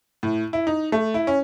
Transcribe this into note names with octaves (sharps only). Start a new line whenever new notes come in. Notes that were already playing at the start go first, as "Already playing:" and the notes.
A2
E4
D#4
A3
E4
C#4